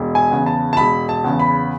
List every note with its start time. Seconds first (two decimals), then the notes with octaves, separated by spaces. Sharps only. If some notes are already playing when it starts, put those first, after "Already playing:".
Already playing: E1
0.15 G#5
0.31 E2 C#3
0.46 A5
0.73 A5
0.77 E1 B5
1.09 A5
1.24 E2 C#3
1.40 B5